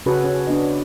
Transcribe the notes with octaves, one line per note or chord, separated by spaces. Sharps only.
C#3 C#4 F#4 G#4 A4 B4
C#4
B3 D4 D#5